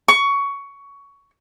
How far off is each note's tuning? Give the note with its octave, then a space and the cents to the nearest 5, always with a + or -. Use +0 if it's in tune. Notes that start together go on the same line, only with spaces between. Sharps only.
C#6 +15